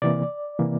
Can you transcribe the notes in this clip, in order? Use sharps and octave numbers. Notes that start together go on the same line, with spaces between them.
C3 E3 A#3 D5
C3 E3 A#3